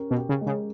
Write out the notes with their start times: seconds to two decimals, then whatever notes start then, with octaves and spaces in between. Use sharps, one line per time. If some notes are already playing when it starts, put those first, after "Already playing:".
Already playing: C#4 G4 A#4
0.11 B2
0.17 G4
0.29 C#3
0.41 G#3
0.47 C#3